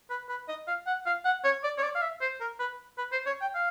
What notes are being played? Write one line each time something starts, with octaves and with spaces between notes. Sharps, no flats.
B4
B4
D#5
F5
F#5
F5
F#5
C#5
D5
C#5
D5
F5
E5
C5
A#4
B4
B4
C5
C#5
G5
F5